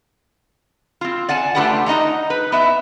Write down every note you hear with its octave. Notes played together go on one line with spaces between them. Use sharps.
C4 F4
D5 F#5 G#5 A5
A3 D4 F4 G4 B4 F#5
D#4 D#5 F#5 A#5
B4
B3 D#5 E5